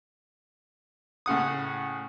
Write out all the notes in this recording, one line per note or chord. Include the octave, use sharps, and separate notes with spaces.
A2 C#3 F#5 D#6